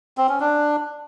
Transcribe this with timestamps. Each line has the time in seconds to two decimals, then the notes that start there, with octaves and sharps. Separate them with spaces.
0.18 C4
0.29 C#4
0.40 D4